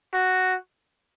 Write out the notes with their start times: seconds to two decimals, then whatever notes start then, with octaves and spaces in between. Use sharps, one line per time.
0.14 F#4